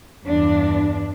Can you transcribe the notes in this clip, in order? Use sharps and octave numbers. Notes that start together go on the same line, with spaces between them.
E2 G2 D4